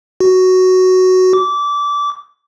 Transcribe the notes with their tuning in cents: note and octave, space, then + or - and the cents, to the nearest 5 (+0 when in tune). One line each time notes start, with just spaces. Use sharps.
F#4 +5
D6 -20